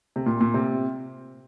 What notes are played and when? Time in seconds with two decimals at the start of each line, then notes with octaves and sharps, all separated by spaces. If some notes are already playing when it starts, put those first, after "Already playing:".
0.16 C3
0.26 A#2
0.41 A#2
0.54 C3